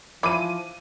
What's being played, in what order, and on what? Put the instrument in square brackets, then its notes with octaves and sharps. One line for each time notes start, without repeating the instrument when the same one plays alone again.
[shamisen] E3 [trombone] F3 [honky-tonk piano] D6 D#7